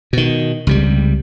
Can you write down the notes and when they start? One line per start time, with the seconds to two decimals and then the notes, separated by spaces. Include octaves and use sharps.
0.13 B2 D#3
0.67 C#2 C3 G3